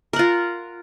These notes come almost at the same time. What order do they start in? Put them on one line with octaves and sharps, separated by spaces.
A#4 F#5 F4